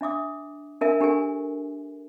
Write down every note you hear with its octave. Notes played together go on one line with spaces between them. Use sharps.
D4 E5 D6 D#6
D4 A#4 E5 G#5
D4 G4 A4 A#4 G#5